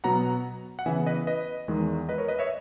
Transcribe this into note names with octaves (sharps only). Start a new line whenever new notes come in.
B2 F#3 B3 F#5 A#5
F#5
C#3 E3 B3 E5 G#5
B4 D#5
B4 D#5
E2 D#3 G#3
B4 D#5
A#4 C#5
B4 D#5
C#5 E5